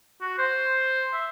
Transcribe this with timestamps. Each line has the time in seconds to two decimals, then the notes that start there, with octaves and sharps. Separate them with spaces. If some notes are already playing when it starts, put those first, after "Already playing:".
0.21 F#4
0.38 C5
1.14 E5